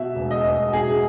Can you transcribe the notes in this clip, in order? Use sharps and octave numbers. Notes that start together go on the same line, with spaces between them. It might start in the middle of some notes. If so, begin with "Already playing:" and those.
Already playing: B2 E5
E1
D#5
E1
B2 G#4